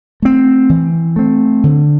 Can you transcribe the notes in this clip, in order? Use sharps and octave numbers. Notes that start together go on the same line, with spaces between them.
A3 C4
E3
A3 C4
D3